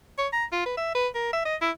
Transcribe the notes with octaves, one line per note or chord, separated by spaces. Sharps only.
C#5
A#5
F4
B4
E5
B4
A#4
E5
D#5
E4